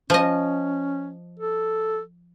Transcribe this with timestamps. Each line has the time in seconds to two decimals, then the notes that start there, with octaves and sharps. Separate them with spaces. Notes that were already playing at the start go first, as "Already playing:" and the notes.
0.10 F3 C#4 D#5
1.40 A4